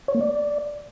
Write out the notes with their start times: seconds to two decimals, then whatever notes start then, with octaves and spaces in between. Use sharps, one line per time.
0.08 C#5
0.15 A#3
0.21 D5